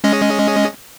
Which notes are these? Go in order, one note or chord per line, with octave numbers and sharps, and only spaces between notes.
G#3 C#4 D#5